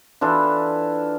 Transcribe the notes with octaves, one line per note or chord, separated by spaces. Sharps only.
E3 D4 F4 A4